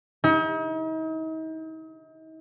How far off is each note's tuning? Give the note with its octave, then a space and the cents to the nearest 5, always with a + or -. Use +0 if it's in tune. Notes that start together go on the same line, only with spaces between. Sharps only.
D#4 +40